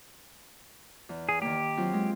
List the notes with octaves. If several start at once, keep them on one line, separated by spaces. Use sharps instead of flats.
E2
G#4
D#3 A#3 G4
F#3 C4 F4
G#3